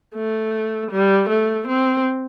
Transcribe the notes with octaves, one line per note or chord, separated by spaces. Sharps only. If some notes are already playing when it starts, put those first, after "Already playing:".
A3
G3
A3
C4